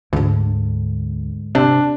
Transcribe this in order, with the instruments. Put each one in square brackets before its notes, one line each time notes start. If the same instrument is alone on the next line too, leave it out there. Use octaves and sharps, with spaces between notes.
[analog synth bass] D2 [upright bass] G#2 D3
[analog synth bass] C3 [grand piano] D4